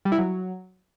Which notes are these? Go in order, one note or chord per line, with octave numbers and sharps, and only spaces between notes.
G3
E4
F#3